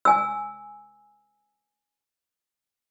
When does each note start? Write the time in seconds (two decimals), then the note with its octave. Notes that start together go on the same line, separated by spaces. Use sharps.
0.05 G#5 E6